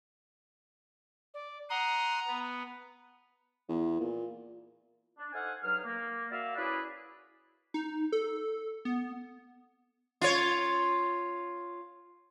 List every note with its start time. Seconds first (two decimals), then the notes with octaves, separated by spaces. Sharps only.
1.34 D5
1.70 F#5 A#5 C6 D#6
2.27 B3
3.69 E2
4.00 A#2
5.18 D4
5.32 D#4 A4 C5 F5 F#5 G#5
5.63 G2 F#3 D#4 G#4 F6
5.85 A#3
6.31 F#4 A#4 D5 E5 F5
6.56 C#4 E4 F#4 G#4 B4 D5
7.74 D#4
8.12 A4
8.85 B3
10.22 F4 C#5